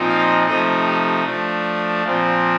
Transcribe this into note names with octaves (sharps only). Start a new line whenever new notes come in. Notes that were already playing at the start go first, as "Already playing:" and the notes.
Already playing: A#2 F3 C4 D#4
F5
C3 F3 A3 D#4 D#5
G4
F3 A3 D4
A#2 F3 C4